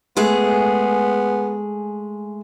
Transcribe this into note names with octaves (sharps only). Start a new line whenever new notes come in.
G#3 A3 B3 G#4